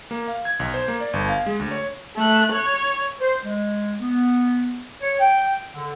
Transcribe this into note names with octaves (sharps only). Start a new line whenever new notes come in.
A#3
F5
G#6
B1
C5
A#3
D5
G1
F5
G#3
D2
C#5
A3 F#6
C#5
C5
G#3
B3
C#5
G5
D3